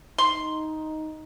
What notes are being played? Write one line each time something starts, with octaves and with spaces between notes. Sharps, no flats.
D#4 C6